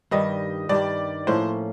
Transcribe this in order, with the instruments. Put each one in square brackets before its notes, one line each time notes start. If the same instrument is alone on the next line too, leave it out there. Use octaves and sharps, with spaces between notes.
[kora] G2 D#3 G3 [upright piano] D#5
[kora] G2 D#3 G3 [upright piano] D5
[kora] A2 F3 A#3 C#4 [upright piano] C5